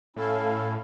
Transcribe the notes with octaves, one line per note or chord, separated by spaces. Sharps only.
A2 C#4 E4 A4 F5